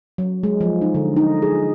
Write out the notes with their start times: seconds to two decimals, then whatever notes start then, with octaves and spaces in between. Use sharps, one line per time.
0.18 F#3
0.43 G#3
0.61 F3
0.82 D#4
0.94 D3
1.16 D#4
1.42 G#4